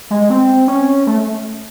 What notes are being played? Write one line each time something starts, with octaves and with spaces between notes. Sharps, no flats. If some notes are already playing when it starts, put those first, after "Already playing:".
G#3
C4
C#4
A3